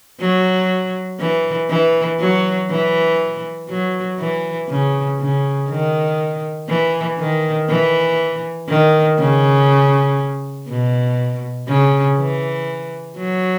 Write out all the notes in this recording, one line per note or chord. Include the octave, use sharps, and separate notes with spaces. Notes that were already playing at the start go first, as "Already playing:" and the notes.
F#3
E3
E3
F#3
E3
F#3
E3
C#3
C#3
D#3
E3
D#3
E3
D#3
C#3
B2
C#3
E3
F#3